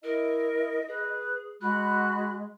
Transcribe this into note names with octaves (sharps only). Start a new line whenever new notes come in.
E4 A#4 D#5
G#4 B4
G#3 F#4 B5 F#6